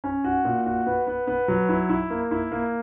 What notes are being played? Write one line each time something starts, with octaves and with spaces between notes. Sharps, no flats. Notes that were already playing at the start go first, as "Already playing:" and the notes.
C#4
F#4
A#2
F#4
B3
B3
B3
F#3
E4
E4
A#3
E4
A#3